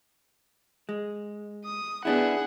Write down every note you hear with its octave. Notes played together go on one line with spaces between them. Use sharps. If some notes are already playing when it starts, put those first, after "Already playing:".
G#3
D#6
B3 D4 E4 G#4 F#5